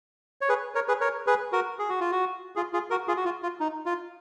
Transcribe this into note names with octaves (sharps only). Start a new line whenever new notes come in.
C#5
G#4 B4
A#4 C#5
G#4 B4
A#4 C#5
G#4 B4
F#4 A#4
G#4
F#4
F4
F#4
F4 G#4
F4 G#4
F#4 A#4
F4 G#4
F#4
F4
F4
D#4
F4